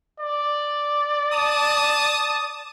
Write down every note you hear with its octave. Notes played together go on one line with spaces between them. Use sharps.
D5
A5 D#6